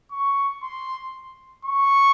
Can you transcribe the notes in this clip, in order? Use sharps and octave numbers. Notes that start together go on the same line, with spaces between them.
C#6
C6
C#6